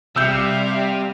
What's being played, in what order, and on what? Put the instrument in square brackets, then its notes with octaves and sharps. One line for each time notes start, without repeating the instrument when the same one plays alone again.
[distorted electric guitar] C3 [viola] G3 F5 [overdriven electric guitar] E5 [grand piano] E6 G6